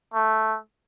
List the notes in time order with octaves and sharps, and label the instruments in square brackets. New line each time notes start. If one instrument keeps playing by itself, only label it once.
[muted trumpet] A3